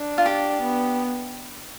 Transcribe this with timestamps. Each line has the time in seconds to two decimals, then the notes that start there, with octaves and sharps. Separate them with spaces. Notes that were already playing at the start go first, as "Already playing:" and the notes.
Already playing: D4
0.18 F4
0.26 G4
0.62 B3